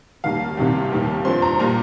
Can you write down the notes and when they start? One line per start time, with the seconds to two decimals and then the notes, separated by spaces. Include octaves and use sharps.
0.24 D#2 D#3 G3 A#3 F5
0.57 C2 C3 D#3 G3
0.92 D#2 D#3 G3 A#3
1.25 G2 F3 C4 C6
1.42 A#5
1.59 A#2 G3 A#3 A#5